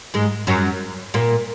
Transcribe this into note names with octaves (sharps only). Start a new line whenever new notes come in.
G#2 G#3
F#2 F#3
A#2 A#3